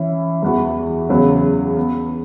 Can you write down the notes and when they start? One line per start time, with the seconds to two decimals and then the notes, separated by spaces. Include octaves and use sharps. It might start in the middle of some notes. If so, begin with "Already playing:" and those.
Already playing: E3 C#4 E4
0.42 E2 E3 B3 F#4
1.09 E2 C#3 F#3 B3
1.77 B3